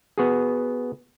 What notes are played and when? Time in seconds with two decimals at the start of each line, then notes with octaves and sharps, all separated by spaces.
0.18 B3 F#4 G#4